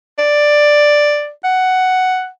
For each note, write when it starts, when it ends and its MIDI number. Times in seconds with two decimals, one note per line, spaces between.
0.19 1.31 74
1.44 2.28 78